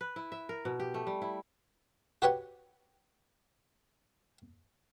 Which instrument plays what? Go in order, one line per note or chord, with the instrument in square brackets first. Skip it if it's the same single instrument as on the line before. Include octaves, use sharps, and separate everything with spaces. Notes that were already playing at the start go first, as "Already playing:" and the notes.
[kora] B4
E4
E5
A#4
B2
G4
A3
G3
E4
[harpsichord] F#4 G4 B4 C#5 F#5